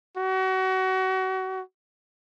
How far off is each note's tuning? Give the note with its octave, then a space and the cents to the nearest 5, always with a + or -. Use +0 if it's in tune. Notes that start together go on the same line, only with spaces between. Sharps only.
F#4 +30